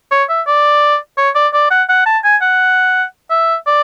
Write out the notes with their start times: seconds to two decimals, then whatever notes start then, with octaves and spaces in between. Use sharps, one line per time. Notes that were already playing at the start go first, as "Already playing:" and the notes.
0.11 C#5
0.29 E5
0.47 D5
1.18 C#5
1.35 D5
1.54 D5
1.71 F#5
1.89 F#5
2.06 A5
2.24 G#5
2.42 F#5
3.30 E5
3.67 D5